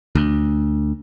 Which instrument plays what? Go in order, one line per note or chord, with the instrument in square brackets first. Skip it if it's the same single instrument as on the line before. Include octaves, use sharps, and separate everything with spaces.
[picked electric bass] D2